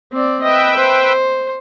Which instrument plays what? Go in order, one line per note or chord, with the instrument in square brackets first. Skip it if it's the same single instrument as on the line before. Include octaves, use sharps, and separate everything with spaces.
[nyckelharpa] C4 D5
[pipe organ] B4 E5 G5 [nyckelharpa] D#5
[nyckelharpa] C5